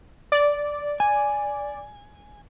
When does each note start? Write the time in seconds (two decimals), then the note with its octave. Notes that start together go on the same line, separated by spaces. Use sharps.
0.32 D5
1.00 G#5